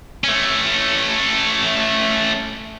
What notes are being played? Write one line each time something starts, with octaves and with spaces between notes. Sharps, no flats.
A3 C#4